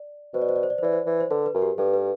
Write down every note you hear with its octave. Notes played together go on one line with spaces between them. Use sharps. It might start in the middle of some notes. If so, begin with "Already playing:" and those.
Already playing: D5
B2 C5
D5
C5
D5
C5
D5
C5
E3 D5
C5
E3
C5
D3 B4
B4
F#2
G4
G2 A4
B4